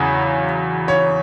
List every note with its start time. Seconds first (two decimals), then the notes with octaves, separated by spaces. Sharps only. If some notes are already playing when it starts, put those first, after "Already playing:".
Already playing: E2 C#3 F#3
0.88 C#5